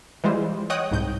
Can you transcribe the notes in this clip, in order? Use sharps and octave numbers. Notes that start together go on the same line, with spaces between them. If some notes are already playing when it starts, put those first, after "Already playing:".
E3 G3 G#3 F4 C5
C#5 D#5 F#5 G5 D#6 F#6
C2 G#2 G6